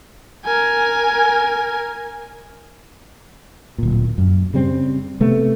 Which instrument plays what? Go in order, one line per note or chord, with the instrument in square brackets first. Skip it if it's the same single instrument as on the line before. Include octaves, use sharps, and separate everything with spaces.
[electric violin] A#4 G#5
[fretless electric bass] D1 A#2
F#2
C#3 G3 C4
C3 A3 B3